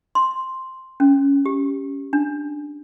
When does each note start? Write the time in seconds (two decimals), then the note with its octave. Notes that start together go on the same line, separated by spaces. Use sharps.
0.15 C6
1.00 C#4
1.46 G4
2.13 D4